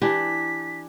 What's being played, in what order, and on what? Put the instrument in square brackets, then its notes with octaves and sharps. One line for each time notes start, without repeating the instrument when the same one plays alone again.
[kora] E3 D4 G4 [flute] B6